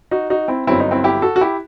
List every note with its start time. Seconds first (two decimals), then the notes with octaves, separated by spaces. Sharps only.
0.11 D#4 F#4
0.30 D#4 F#4
0.48 C4 E4
0.67 G1 G2 F#3 B3 C4 E4
0.80 D#4
0.91 C4 E4
1.04 E4 G4
1.22 F#4 A4
1.36 F#4
1.41 E4 G4